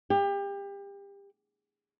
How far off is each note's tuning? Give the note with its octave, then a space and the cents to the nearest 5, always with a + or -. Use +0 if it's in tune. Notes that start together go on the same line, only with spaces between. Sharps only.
G4 +30